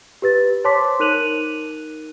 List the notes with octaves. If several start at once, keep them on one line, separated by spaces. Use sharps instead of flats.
G4 B4 A6
C5 C#5 A5 C6 D6 B6
D#4 A#4 F#6 D#7 F7 F#7